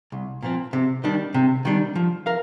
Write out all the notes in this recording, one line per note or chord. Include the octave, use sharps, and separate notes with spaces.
C2
A#2 F3 C4
C3
D#3 G3 D4
C3
D#3 G3 D4
F3
A#4 F5